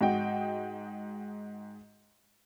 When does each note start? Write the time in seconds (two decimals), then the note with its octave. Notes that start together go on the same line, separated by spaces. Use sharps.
0.01 G#2 F#4 D#5 G5